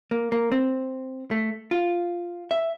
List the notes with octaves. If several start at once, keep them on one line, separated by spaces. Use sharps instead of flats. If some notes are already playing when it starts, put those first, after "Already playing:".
A#3
A#3
C4
A3
F4
E5